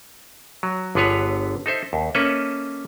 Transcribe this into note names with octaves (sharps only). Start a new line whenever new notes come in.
F#3
G1 D3 B3 G#4 B4 C#5
D#4 A4 C5 E5
D#2
A#3 C#4 A4 B4 D#5 E5